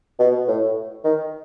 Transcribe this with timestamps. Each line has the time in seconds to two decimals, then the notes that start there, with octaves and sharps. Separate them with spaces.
0.19 B2
0.48 A2
1.04 D#3